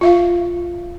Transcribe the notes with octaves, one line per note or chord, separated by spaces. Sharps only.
F4 E5 F5